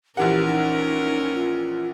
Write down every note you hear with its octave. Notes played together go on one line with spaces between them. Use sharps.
A#1 E3 C#4 G4 A#4 F#5
D#4
F4